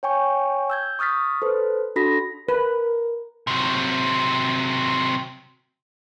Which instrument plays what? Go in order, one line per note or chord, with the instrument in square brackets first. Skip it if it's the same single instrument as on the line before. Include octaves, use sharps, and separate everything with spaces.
[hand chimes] C#5 G5 G#5 C#6
E6 G6 G#6
C#6 D#6 F6 A6 B6
A4 B4 C5
D4 F#4 A4 B5 A#6 B6
[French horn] A#4 [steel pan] B4
[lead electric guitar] C3 F#3